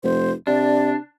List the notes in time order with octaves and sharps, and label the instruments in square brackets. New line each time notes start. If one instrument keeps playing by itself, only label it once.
[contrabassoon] F1 [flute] C5
[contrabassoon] C3 [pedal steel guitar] D4 [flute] D5